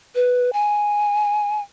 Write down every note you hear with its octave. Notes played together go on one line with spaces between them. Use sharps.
B4
G#5